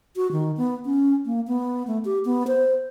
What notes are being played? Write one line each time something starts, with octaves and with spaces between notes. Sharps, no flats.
F#4
D#3
B3
C#4
A#3
B3
A3
G4
B3
C5